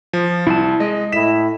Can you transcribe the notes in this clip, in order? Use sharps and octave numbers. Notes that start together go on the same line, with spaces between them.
F3
C2 E4 A5
G#3 D#5
A2 E4 B6 E7